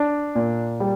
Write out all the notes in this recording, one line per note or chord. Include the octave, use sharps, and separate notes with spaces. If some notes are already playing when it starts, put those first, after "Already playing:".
Already playing: D4
A#2
G3